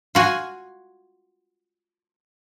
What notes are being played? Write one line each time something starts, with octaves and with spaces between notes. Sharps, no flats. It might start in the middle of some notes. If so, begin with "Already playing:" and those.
F4 F#4 G#5